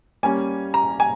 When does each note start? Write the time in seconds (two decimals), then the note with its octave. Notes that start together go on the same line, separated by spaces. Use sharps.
0.23 G3 A#3 C#4 G#5
0.74 A#5
1.00 G#5